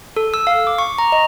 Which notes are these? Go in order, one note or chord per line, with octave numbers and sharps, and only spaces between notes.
A4
E6
F5
D6
C#6
A#5
D#5